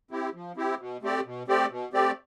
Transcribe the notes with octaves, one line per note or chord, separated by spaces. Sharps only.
C4 E4 G4
F3
C4 E4 G4
B2
A3 C4 G4 D5
B2
A3 C4 G4 D5
B2
A3 C4 G4 D5